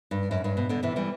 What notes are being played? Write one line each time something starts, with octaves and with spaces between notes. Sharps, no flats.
G2
F#2
G2
B2
B2 D3
C3 E3
E3 G3